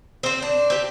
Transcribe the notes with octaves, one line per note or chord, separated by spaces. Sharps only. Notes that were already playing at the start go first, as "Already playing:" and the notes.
C4 C5
D4
C4 G4